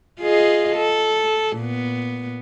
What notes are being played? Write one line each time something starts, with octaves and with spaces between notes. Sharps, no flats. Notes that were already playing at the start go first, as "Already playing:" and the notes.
F4 G#4 D#5
A4
A#2 B3